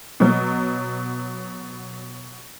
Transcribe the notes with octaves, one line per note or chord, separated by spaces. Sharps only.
B2 F#3